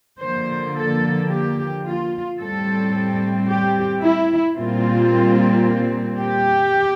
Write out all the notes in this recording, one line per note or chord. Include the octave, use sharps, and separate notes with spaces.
D3 F3 A#3 C5
A4
G4
F4
A2 G3 C4 A4
G4
E4
A#2 G3 C4 F4
G4